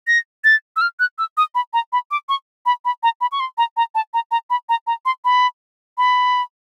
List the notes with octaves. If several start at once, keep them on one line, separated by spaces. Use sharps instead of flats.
A#6
A6
E6
F6
F#6
E6
D#6
B5
A#5
B5
D6
C#6
B5
B5
A#5
B5
C#6
C6
A#5
A#5
A5
A#5
A#5
B5
A#5
A#5
C6
B5
B5